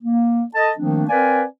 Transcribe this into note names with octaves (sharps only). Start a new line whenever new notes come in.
A#3
A4 D#5 A5
D#3 F3 A3 A#3 C4 D4
C4 A#4 B4 D5 F5 G#5